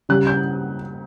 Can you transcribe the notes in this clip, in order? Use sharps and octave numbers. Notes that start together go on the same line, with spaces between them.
C#3 G3 F#6
G6